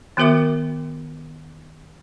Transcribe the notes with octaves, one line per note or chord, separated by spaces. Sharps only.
D#3 B3 F#4 A#4 E5 D6